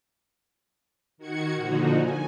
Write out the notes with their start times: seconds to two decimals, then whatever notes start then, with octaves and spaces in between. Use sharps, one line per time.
1.18 D#3 F#4 G#6 C#7
1.56 A#2 D3 F3 D#4 F#4
1.95 G#5